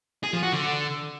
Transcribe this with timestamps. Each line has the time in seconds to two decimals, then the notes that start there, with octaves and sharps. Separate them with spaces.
0.23 G#4
0.33 F3
0.43 F#4
0.52 D3